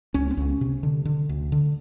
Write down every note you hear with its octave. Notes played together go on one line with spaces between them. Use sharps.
C#2 C#4
C4
C#2 C#4
C3
D3
D3
D2
D3